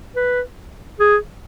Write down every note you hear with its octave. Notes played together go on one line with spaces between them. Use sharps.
B4
G#4